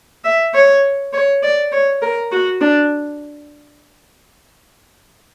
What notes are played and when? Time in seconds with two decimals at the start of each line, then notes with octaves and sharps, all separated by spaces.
0.24 E5
0.54 C#5
1.13 C#5
1.43 D5
1.72 C#5
2.02 A#4
2.32 F#4
2.61 D4